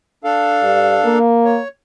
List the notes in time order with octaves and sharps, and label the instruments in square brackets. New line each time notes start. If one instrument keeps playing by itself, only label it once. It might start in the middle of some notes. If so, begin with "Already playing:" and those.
[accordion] D4 A4 F5
[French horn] G2
A#3
[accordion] C#5